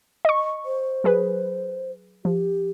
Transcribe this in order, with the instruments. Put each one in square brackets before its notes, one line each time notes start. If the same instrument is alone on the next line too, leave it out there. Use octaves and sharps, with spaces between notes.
[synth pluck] D#5 C#6
[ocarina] C5
[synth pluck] F#3 G#4 B4
[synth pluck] F3 [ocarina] G4